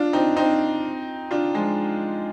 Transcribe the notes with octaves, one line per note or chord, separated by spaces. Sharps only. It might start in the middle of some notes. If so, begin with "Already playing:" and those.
Already playing: D4 F4
C4 D#4
C4 D#4
D4 F4
F3 G#3